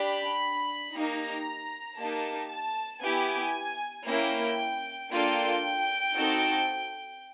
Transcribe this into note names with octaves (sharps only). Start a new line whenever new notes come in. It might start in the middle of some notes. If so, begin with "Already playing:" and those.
Already playing: D4 G4 B5
A#3 D#4 G4 A#5
A#3 D#4 G4 A5
A5
B3 E4 G4 G#5
A#3 C#4 E4 G5
A#3 D4 F4 A4 G5
C4 D#4 F#4 A4